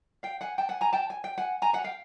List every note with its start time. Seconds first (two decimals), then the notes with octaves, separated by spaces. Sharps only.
0.23 F5 G5
0.41 F#5 G#5
0.58 G5 A5
0.69 F#5 G#5
0.81 G#5 A#5
0.93 G5 A5
1.10 G#5
1.24 G5
1.38 F#5 G#5
1.62 G#5 A#5
1.73 F#5 G#5
1.84 F5 G5